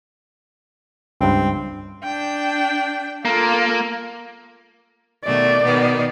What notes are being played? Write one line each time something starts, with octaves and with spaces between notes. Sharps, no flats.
C#2 G2 C4
D4 G5
A#3 F4 A4
B2 D#3 A3 D5
B2 D#3 B3